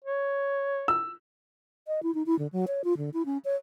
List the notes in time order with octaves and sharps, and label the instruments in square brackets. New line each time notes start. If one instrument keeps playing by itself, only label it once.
[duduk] C#5
[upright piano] E6
[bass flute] D#5
E4
D#4
E4
D3
F#3
C#5
F4
D3
E4
C#4
C#5